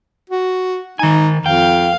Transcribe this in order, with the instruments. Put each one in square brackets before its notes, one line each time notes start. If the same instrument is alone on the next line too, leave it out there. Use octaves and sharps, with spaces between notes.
[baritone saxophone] F#4
[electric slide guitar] D#3 G#5 [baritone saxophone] D#4
[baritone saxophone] F2 [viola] F5 [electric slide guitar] G5